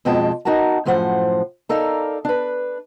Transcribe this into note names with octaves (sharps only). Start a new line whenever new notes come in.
F2 B2 F3 G#3 G5 A5
D#4 F#4 A#4 F#5 A5
F#2 A2 F3 C5 F#5
D#4 A4 A#4 D5 F5
D4 B4